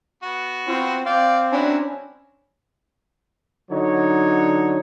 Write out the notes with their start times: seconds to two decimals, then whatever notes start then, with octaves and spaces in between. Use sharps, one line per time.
0.23 B3 F#4
0.67 C4 F4
1.06 C4 D5 F5 G5
1.52 F#3 C#4 D4 E4
3.71 D3 F#3 D#4 C#5